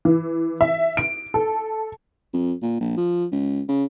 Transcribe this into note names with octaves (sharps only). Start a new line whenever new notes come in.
E3
E5
D7
A4
F2
A#2
A#1
F3
C#2
C#3